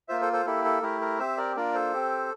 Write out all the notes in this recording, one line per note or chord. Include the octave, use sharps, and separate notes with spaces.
A#3 F4 C5 E5
A4 C5
A4 C5
A#3 E4 G4 A4
A4
A3 E4 G4 A#4
A#4
C4 G4 C5 E5
A#4 D5
A#3 D4 F4 A#4 D5
A4 C5
C4 G4